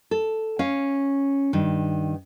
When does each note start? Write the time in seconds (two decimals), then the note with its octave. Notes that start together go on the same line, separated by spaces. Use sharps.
0.11 A4
0.59 C#4 F5
1.53 G2 D#3